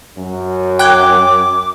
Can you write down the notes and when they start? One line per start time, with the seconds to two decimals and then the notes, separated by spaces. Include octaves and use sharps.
0.17 F#2
0.79 G5 D6 F#6 G#6